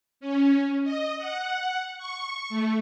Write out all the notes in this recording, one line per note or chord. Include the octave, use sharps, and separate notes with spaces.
C#4
D#5
F#5
C#6
A3